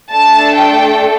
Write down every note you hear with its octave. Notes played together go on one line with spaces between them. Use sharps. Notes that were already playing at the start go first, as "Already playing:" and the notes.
A3 D4 A4 A5
G5